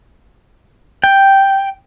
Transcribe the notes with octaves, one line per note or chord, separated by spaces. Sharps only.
G5